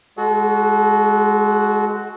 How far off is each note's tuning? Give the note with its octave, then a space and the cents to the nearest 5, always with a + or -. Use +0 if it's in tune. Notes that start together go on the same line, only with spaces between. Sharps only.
G#3 +0 F#4 +0 A4 -40